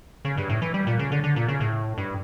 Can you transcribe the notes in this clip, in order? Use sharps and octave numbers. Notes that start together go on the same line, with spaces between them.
C#3
G2
A2
E3
G3
A#2
C#3
D3
D3
A#2
C#3
A2
G2